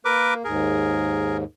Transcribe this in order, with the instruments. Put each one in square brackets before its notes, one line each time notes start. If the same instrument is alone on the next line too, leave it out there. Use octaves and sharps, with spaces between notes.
[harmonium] A#3 [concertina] A#4 B4 D6
[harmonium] D#2 G#2 [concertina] G#4 A#4